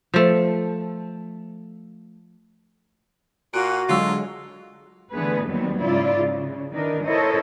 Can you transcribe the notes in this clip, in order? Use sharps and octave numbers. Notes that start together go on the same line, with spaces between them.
F3 A3
A#2 F#4 F5 F#6 D7 D#7
D3 F#3 G#3 F4 F5 E6
D3 E3 A3 B3 G#4 B4
D#2 D#3 F#3 G3 B3 C4
G#2 C#3 E4 F4 D5
C#3
D#3 E3 D4 D#4 A#4
E4 A4 A#4 C5 C#5 D#5